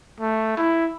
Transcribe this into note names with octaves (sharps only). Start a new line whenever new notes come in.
A3
E4